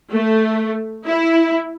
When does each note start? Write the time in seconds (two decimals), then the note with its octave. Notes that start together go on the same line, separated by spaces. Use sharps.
0.13 A3
1.06 E4